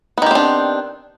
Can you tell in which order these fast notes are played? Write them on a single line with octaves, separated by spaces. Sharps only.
B3 D#3 G4 C4 D4